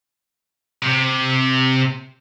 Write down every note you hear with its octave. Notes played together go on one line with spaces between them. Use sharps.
C3